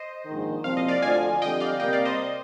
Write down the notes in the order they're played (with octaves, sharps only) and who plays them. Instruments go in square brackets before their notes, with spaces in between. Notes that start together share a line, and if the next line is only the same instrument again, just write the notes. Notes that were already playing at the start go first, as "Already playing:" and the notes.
Already playing: [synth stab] C5 D#5
[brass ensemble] A#1 G#2 D#3
[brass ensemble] C2 A#2 F3 C4 [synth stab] F5
[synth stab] D#5
D5 F5
[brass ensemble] D2 D3 F3 [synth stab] F5 G#5
[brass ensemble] F2 D3 G3 [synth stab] D#5 G5
[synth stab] D5 F5
[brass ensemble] C3 G3 A#3 [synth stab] D#5 G5
[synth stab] D5 F5
C5 D#5